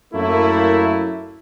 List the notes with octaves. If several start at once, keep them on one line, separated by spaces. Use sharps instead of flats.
F#2 A3 A#3 E4